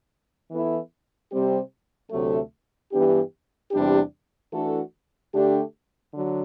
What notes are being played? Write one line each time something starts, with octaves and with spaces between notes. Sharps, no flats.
E3 B3 E4 A4
C3 G3 C4 G4
D2 C3 F#3 A3
G2 E3 B3 D4 G4
E2 C3 G3 D4 G4
E3 A3 D4 F#4 A4
D3 A3 D4 G4
D3 F#3